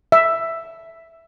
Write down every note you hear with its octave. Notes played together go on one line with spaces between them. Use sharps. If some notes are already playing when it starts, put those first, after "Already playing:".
E5